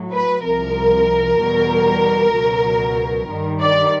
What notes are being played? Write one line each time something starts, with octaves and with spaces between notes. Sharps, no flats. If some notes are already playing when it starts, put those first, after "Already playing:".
Already playing: A2 F#3
B4
C2 C3 F3 A#4
E2 B2 G3
C#2 B2 F#3
G2 D#3 G3
D5